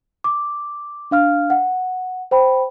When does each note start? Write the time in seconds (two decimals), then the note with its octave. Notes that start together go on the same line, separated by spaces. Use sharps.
0.24 D6
1.11 D4 F5 F6
1.50 F#5
2.31 C5 G5 B5